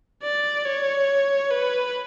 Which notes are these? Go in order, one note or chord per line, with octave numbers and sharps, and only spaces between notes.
D5
C#5
B4